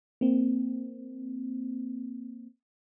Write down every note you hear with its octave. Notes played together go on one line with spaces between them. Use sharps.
A#3 C4